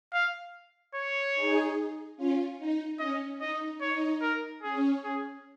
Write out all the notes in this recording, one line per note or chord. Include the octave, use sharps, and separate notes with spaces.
F5
C#5
D#4 G#4
C#4 F4
D#4
C#4 D#5
D#4 D#5
D#4 C#5
A#4
C#4 G#4
G#4